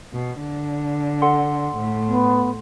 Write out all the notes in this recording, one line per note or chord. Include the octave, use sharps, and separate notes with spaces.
B2
D3
A4 F#5 C6
A2
B3